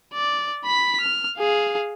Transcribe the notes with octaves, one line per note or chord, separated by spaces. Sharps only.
D5
B5 B6
F6
G#4 F5